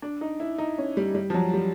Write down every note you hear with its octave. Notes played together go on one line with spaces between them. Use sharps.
D4
D#4
E4
D#4
C#4
G3
G3
F3
F#3
G3